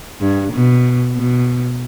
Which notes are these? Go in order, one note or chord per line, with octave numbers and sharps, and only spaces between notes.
G2
B2
B2